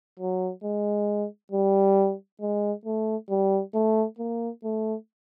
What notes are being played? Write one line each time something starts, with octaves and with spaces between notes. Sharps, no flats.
F#3
G#3
G3
G#3
A3
G3
A3
A#3
A3